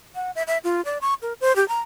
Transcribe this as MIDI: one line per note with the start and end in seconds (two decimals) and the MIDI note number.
0.15 0.31 78
0.35 0.43 76
0.47 0.58 76
0.64 0.84 65
0.85 0.98 74
1.01 1.14 85
1.22 1.33 70
1.41 1.55 72
1.56 1.67 67
1.69 1.81 82